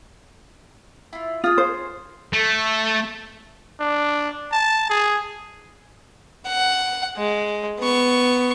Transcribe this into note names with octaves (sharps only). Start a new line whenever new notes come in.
E4 F4
F4 G#4 D#6
C5
A3
D4
A5
G#4
F#5
G#3
B3 C#6